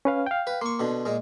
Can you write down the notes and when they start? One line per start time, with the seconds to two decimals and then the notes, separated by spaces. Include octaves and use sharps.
0.05 C#4 B4 F5
0.27 F5 G5
0.47 B4
0.61 A#3 C6 C#6
0.79 B2 D3
1.05 A#2 G#3